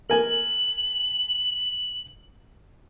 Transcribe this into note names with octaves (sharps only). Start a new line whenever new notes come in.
A#4 G#5 F#7